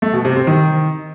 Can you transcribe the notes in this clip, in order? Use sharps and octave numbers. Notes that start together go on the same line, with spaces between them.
A3
B2
C3
C4
D#3